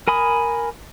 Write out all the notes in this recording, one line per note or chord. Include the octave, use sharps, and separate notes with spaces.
A#4 G#5 B5 D#6